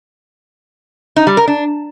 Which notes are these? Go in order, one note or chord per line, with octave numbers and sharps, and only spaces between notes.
D#4
G3
A#4
D4